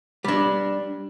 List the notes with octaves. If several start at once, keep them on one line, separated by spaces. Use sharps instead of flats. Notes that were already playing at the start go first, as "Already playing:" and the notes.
G3 D4